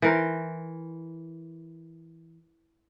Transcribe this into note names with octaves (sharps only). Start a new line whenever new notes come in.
E3 A#4 C5